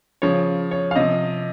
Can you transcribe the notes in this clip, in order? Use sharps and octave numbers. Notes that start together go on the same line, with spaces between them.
C#3 F3 C#5
C#5
F5
C3 F3 D#5